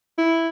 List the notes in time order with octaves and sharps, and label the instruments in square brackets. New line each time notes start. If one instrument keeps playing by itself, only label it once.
[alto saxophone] E4